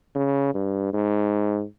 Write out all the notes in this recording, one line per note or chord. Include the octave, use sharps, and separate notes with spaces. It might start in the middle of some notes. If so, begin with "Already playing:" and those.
C#3
G2
G#2